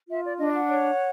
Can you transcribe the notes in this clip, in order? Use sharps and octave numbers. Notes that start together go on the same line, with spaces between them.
F4 E5
D5
D4 D#5
F#5
C#5